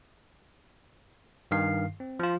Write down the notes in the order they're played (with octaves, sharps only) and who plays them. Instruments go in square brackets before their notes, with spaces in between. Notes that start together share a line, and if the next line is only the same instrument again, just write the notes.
[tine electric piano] G2 D#3 F5 C7
C4
F3 F4